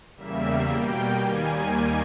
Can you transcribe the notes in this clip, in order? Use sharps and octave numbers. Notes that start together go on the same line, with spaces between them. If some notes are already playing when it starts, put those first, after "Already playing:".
E2 C#3 G3 A#3 E5
B2 G3 A#3 G5
D#2 D#3 G3 A#3 G#5